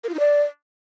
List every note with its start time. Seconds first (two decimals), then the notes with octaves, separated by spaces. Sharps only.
0.04 A#4
0.09 F4
0.14 D#4
0.19 D5